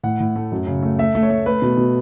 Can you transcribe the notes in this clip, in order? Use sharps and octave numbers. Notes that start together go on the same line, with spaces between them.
A2 F#5
A2
A3
F#2
C#3
A3
A3 E5
A3
C#5
A3
A3 B4
B2
B2